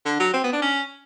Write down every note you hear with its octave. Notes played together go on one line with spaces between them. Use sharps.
D3
F#3
C4
B3
D4
C#4